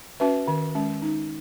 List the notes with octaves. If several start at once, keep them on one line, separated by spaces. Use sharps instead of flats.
C#4 F#4 B4 E5
D#3
G#3 C#4
D#4